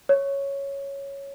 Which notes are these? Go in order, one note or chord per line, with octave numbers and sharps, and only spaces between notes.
C#5